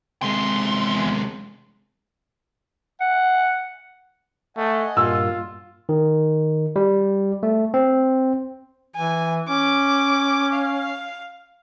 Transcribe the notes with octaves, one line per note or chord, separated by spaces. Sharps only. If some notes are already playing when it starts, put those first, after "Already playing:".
E2 C3 G#3 C6
F#5
A3 D#5 F#5 G#5
G2 A#2 F4 E6
D#3
G3
A3
C4
E3 G#5
C#4 D6
F5